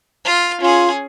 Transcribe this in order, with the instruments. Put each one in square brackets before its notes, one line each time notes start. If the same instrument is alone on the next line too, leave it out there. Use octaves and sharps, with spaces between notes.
[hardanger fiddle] F4 F5
[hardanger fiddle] C#4 G#4 [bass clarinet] F4